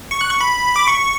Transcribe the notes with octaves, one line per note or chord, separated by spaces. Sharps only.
C#6
F#6
C#6
B5
D6
C#6